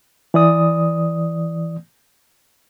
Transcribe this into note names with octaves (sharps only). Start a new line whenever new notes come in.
E3 D5 D#6